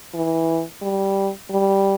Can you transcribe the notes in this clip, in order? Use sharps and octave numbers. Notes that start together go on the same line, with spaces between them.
E3
G3
G3